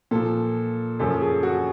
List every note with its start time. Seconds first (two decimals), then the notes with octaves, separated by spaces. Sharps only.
0.11 A#2 F3 A4
0.99 F#2 C#3 F3 A4
1.21 G#4
1.43 F#4